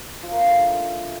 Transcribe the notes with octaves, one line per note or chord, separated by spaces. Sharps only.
F3
A#3
D4
A3